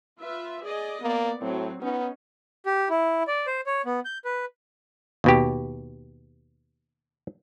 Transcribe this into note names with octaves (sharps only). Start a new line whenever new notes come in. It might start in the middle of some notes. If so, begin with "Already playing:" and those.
F4 B4 E5
G#4 D5 D#5
A#3 B3 D5
A2 F#3 C4
B3 C#4 D#4
G4
E4
D5
C5
C#5
B3
G6
B4
D#2 B2 G4